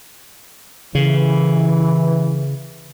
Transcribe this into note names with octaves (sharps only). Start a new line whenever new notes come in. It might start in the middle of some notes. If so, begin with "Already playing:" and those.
C#3 E3